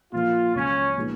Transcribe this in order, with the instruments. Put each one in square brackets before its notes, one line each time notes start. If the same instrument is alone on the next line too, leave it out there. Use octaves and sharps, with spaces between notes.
[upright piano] A#2 F3 A#3 [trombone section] F4
[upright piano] C#2 C#3 F#3 [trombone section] C#4
[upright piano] A#2 F3 G#3 B3 D#4